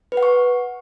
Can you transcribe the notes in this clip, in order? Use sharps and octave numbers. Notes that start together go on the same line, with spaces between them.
B4
F#5
C#6